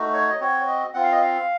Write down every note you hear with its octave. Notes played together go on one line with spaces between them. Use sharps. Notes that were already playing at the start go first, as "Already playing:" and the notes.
Already playing: A3 D#4 F#4
C#5
D#5
C4 F#4 C#5
D#5
C4 F4 F#5
F5
D#5
F5